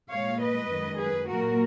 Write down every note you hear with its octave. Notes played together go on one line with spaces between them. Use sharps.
A#2 G#3 C#5 F5
B4 D#5
F#2 D#3 G#3
G#4 B4
A#2 F#3 A#3 F#4 A#4